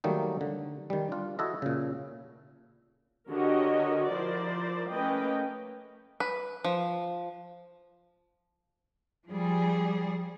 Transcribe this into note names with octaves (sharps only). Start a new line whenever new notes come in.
D#3 F#3 G3 A3 A#3 D#4
D3
D#3 G3
D4 F4
E4 F#4 A4 D#5
A#2 C#3
D3 F#4 G4 A#4 C#5 D#5
F3 E4 A#4 C5 D5
A3 A#3 C#4 B4 D#5 G5
B4
F3
F3 G3 G#4